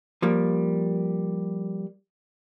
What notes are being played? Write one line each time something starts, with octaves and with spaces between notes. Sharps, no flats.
F3 G3 A#3